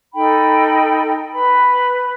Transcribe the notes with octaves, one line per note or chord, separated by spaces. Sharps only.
D#4 A4 G5 B5
B4 B5